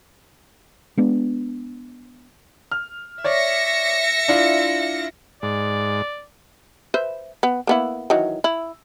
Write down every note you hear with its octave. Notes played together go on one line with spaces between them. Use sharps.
G#3 B3 D4
F6
C#5 D5 E5 A#6 C#7
D4 E4 F4
G#2 D5
B4 C5 E5
B3
A#3 B3 E4
D#3 E3 F#3
E4